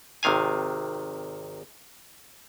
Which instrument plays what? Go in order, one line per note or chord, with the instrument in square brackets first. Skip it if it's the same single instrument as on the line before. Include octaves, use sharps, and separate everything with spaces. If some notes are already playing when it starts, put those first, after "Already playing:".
[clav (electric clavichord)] G#1 C3 D#3 F5 G#5